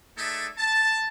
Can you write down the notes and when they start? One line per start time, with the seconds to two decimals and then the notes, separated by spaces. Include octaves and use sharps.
0.17 A3 D#4 G#4 A4 D5 E5
0.58 A5